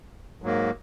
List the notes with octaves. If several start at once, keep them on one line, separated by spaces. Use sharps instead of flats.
G#2 F#3 A#3